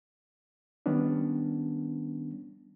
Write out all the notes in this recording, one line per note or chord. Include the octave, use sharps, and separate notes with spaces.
D#3 G3 B3 C#4 D4